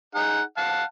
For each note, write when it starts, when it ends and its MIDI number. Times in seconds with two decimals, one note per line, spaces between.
0.15 0.41 63
0.15 0.41 68
0.15 0.41 78
0.57 0.83 77
0.57 0.83 78
0.57 0.83 81